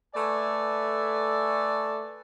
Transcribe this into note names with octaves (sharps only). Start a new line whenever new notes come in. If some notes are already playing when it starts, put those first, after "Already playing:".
A3 A4 B4 D5 E5 G#5